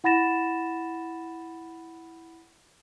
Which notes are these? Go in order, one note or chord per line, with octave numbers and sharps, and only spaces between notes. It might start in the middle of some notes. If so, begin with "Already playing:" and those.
E4 F#5 B5 A6 A#6 E7